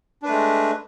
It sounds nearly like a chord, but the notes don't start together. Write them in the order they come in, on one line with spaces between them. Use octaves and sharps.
D4 B4 A3 G#3